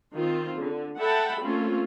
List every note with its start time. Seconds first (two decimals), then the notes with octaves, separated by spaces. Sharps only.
0.15 D#3 C4 F4
0.57 D3
0.99 A4 E5 F#5 G5 A5 B5
1.41 A3 A#3 C4 C#4 F4